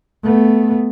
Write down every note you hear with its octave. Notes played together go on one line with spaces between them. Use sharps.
A3 B3